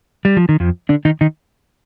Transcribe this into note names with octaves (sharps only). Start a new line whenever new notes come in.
G3
F3
D#3
F2 F3
D3 D4
D#3 D#4
D#3 D#4